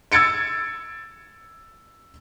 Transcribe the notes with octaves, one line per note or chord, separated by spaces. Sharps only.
E6 G#6 A6 C#7 D7